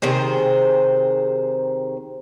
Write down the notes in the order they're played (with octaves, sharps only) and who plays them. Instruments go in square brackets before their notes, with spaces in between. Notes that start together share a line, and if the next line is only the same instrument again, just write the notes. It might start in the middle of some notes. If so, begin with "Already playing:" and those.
[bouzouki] C3 D#3 G#4 C5